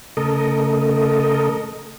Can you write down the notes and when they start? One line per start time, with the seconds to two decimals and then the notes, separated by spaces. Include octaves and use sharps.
0.17 C#3 A3 A4 A#4 D#5